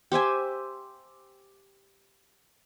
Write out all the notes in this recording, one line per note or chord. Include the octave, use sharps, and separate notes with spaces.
G4 C5 E5 G#5